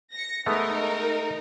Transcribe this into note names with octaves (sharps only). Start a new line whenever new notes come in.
A#6 C#7
G#3 A3 B3 D#4 A#4